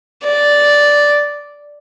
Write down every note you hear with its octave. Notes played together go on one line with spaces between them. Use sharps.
D5